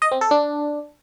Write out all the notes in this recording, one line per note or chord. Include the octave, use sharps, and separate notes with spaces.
D#5
C4
A4
D4